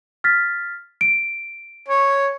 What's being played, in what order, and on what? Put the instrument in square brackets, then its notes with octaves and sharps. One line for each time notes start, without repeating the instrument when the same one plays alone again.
[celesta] F6 A6 B6
D7
[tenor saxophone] C#5